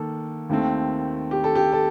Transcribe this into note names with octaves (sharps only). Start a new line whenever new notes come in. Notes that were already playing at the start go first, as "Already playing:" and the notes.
Already playing: D#3 A#3 A4
D#2 D#3 A3 C4
G4
A4
G4
A4